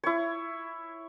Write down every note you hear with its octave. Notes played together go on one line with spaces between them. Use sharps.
E4 C#5